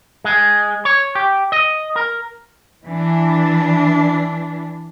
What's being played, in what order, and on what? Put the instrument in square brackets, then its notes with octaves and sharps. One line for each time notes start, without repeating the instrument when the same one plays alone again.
[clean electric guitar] G#3
C#5
G4
D#5
A#4
[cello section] E3 D4